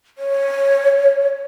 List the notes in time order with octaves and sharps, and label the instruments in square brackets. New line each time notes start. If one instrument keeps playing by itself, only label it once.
[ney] C#5